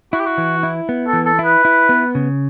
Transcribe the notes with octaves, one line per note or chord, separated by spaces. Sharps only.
E4 F#4
G4
F#4
E3
E4
B3
A4
E3
A4
E4
B4
E4
B3
C#3